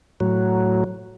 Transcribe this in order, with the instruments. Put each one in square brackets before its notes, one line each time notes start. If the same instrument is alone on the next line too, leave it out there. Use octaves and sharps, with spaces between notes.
[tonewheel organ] A2 F#3